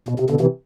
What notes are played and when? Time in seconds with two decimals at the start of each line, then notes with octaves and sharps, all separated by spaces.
0.09 B2
0.20 C3
0.30 B2 D3
0.41 C3 E3